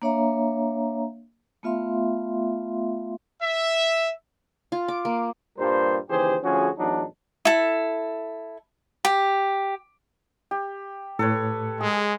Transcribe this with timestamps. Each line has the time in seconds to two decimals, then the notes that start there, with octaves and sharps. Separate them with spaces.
0.02 A#3 D4 C#5 E5 F5 A#5
1.63 A3 B3 F4 E5 F5 C6
3.43 E5
4.72 F4
4.88 D6
5.05 A#3
5.58 G2 A#2 G3 A#4 C5
6.08 D#2 C#3 E3 G4 G#4 C5
6.43 D2 F3 C#4 F#4 G#4
6.77 A1 E2 F#3 D4 D#4
7.45 E4 A4
9.05 G4
10.51 G4
11.19 A2 A4 B4 C#5
11.81 G#3 G#4